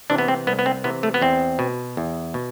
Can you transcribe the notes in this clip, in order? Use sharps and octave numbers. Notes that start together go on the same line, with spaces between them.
C3 E3 D4
B3
C4
C2 B3
B3
C4
C3 E3 B3
A3
B3
E2 C4
B2
E2
B2